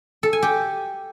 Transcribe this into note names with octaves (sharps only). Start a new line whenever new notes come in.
A4
G#5
G4